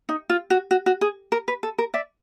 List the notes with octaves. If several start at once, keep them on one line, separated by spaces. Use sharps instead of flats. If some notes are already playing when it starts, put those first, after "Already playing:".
D#4
F4
F#4
F#4
F#4
G#4
A#4
B4
A4
A#4
D5 E5